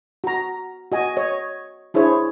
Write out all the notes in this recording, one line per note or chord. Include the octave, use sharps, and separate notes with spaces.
F#4 A#5
F#4 D#5 G#5
C#5 D#5
D4 E4 G#4 C5 C#5